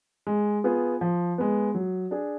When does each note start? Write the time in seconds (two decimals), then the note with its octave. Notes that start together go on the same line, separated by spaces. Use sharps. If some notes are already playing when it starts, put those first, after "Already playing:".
0.27 G#3
0.64 B3 F4 G#4
1.01 F3
1.38 G#3 B3
1.74 F#3
2.11 D4 G#4